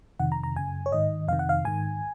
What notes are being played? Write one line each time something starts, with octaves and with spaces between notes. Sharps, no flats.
F2 C3 D#3 F#5
A#5
A#5
F#2 C#3 G#5
C#5
G#2 D#3 D#5
F2 C3 D#3 F5
F#5
F5
G#2 D#3 G#5